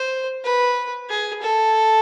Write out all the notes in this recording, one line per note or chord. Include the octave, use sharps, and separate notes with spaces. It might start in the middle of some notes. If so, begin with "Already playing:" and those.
Already playing: C5
B4
G#4
A4